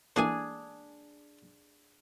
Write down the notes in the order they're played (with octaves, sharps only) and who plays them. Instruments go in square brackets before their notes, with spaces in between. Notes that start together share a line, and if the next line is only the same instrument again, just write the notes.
[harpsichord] E3 A#3 A4 [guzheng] D4 G#4 G#5